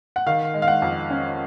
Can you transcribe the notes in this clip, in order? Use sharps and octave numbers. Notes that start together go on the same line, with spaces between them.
F#5
D#3 F5
G#3
F5
F#5
F2
C#4